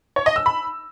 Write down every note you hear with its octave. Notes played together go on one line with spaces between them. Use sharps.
C#5
D#5
E6
B5